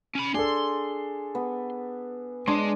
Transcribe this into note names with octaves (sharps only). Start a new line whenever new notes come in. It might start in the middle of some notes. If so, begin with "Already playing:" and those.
C#4 B5
D4 G#4 A4 C6
B3
G#3 D4 C6